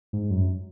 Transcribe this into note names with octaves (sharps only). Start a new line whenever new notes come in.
G#2
F#2